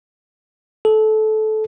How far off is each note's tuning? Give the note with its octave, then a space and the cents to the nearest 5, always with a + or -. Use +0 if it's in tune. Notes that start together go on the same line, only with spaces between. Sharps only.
A4 -20